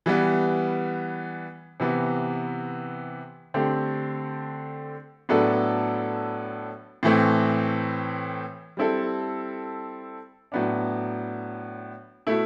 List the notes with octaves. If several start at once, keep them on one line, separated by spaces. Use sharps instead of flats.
E3 G3 B3
C3 E3 B3
D3 A3 C4 G4
A2 F#3 B3 D4 A4
A2 E3 A3 C4
G3 C4 E4 A4
A2 F#3 B3 D4
B2 A3 E4